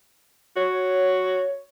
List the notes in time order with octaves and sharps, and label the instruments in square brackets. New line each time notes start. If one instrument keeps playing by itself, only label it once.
[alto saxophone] F#4 [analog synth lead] C#5